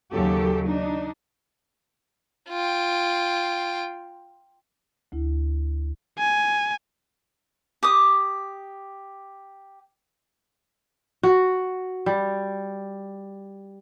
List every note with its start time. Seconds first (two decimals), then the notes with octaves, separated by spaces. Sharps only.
0.13 D#2 C#3 F#3 G4 A4
0.67 D4 D#4
2.50 F4 G5
5.12 D2 E4
6.19 G#5
7.83 G4 D6 D#6
11.23 F#4
12.06 G3